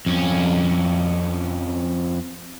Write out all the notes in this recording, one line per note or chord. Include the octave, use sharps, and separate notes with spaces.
F2 C#4